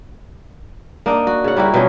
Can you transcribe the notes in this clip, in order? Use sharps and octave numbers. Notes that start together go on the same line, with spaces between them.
A#3 D4 D#4 D#5
F#4
C#3 F#5
G3 A#3 E4 F#4
B2 F3 F#3 C#4